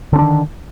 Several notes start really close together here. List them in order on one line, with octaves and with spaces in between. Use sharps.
D3 C#4 D4 D#3